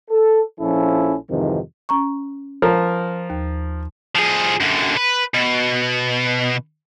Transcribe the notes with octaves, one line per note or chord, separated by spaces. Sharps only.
A4
A#1 F3 C#4 E4 A4
F2 G#2 C3 D#3 E3
C#4 A#5 C#6
F3 A#4
D#2
F3 G#4
F#2 D3
B4
B2